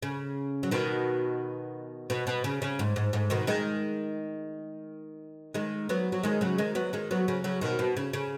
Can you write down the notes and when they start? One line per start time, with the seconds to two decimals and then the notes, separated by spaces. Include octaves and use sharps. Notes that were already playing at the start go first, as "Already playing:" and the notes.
0.02 C#3
0.63 F#3
0.71 B2 D#3
2.10 B2
2.27 B2
2.44 C#3
2.62 C#3
2.79 G#2
2.96 G#2
3.13 G#2
3.30 B2 D#3
3.47 D#3 G#3
5.54 D#3 G#3
5.89 F#3 B3
6.12 F#3
6.23 D#3 G#3
6.41 C#3 F#3
6.58 D#3 G#3
6.75 F#3 B3
6.93 D#3 G#3
7.11 F#3 B3
7.28 C#3 F#3
7.44 C#3 F#3
7.61 B2 D#3
7.79 B2
7.97 C#3
8.13 C#3